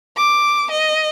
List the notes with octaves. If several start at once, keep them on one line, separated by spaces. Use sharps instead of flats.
D6
D#5